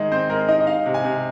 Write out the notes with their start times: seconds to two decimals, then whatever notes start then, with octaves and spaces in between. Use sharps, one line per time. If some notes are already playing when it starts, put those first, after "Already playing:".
Already playing: D#3 G#3 D#4 D#5
0.12 C4 C5
0.30 G#3 A#4
0.48 D#4 D#5
0.60 D#5
0.67 D#4 F5
0.86 C3
0.94 G#5
1.04 C3